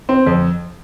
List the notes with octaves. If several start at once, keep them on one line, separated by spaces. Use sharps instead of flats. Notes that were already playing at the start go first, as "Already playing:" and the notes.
C4
F2